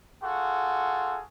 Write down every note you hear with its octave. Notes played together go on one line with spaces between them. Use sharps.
F4 F#4 G#4 A4